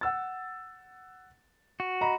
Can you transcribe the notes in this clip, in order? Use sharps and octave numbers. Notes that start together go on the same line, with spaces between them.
F#5 E6 A6
F#4
D#5 A#5 B5